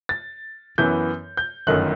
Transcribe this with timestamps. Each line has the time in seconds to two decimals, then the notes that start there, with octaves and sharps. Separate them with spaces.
0.09 A6
0.78 F#2 E3 B3 G6
1.37 G6
1.67 G1 F#2 D#3 A3 F#6